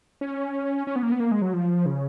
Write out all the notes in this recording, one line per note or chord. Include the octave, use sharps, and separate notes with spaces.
C#4
C#4
B3
A#3
B3
A#3
G#3
F#3
F3
C#3